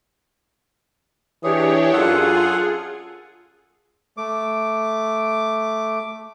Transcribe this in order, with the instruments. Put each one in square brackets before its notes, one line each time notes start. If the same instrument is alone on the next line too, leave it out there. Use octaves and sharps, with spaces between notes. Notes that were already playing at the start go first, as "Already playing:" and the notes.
[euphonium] E3 [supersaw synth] D4 G4 C#5 [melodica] G#4
[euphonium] F#2 [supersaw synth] F4 G#4 [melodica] A4 F#5
[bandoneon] A3 D6